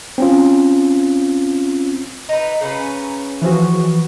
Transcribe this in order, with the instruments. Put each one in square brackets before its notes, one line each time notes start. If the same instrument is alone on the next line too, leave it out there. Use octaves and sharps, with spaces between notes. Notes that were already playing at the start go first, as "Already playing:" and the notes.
[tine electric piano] C4 C#4 F4
[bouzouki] D#4 B4 [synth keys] A#5
[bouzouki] C#3 C#4 B4
[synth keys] E3 F3 F#4